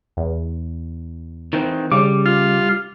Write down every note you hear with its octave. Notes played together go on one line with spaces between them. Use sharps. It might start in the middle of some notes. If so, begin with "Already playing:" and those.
E2
D#3 E3 C4
C#3 G3 D6
F4